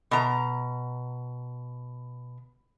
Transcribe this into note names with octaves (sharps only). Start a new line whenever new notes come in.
B2 A#5